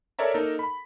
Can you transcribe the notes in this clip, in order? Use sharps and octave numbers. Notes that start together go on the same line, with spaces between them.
A4 A#4 C#5 D5 E5 A#5
A#3 D#4 A4 A#4
B5